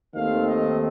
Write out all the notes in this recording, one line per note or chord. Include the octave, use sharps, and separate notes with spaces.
D#2 D#3 A3 C4 F5
D#5